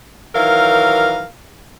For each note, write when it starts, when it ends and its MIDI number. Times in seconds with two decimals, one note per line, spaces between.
0.35 1.26 51
0.35 1.26 52
0.35 1.26 54
0.35 1.26 70
0.35 1.26 77